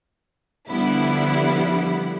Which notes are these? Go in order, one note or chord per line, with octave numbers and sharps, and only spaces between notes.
D3 F3 G3 B3 E4